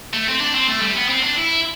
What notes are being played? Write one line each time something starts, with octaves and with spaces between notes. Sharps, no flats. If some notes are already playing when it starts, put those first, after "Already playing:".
A3
C4
D4
C4
A3
G3
B3
C4
D4
E4